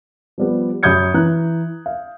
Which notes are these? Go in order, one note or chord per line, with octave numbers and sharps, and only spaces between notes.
F3 G3 B3
F#2 B5 D#6 G6 G#6 C#7
E3 A#5 F#6
F5